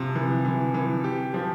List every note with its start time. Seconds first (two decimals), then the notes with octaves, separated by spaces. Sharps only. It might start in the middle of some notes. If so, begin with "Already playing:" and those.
Already playing: C3 F3
0.15 E3
0.45 E3
0.74 E3
1.04 G4
1.34 F3